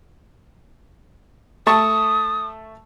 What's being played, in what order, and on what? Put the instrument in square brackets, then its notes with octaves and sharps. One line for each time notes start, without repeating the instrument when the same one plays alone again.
[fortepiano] A3 A5 C#6 [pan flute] D#6